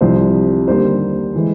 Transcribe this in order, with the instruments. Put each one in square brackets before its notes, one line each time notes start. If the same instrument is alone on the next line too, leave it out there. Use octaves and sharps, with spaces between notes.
[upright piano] C2 C3 F3 C5
D#2 D3 G3 A#3 C5
E3 G#3